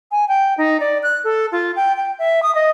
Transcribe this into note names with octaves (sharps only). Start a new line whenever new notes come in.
G#5
G5
D#4
D5
F#6
A4
F4
G5
G5
E5
D#6
D#5